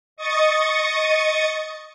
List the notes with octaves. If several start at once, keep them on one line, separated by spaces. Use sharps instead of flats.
D#5 C#6 D#6 A6 C#7